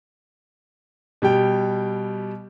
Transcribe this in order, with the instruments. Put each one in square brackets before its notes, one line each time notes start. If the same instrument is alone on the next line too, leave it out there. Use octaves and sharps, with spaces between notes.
[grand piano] B2 G3 G4 G5